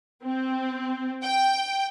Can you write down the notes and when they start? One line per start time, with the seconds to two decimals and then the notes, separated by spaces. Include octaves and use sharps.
0.24 C4
1.23 G5